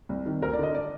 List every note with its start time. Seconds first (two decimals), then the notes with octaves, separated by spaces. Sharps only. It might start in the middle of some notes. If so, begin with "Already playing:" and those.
0.09 C2
0.26 C3 D#3
0.42 D2 A#4
0.53 D5
0.59 D3 D#5
0.75 D5